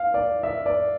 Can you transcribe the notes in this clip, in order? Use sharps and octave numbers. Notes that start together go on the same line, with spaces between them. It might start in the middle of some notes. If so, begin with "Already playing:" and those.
Already playing: F5
D5
E5
D5